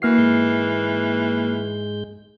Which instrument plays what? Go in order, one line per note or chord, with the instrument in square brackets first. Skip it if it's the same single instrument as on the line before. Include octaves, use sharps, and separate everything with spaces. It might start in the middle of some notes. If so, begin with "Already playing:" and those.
[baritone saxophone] E3 [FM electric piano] A#3 F6 C7 [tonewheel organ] F#4
[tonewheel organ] G#2 G#3 G6